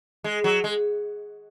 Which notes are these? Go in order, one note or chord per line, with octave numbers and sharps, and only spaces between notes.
G#3
F#3
G#3